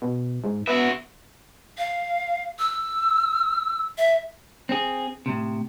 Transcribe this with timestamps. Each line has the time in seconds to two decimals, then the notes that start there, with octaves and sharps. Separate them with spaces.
0.02 B2
0.44 G#2
0.67 B3 F#4 E5
1.78 F5
2.59 E6
3.98 E5
4.69 C4 G#4
5.26 A2 C3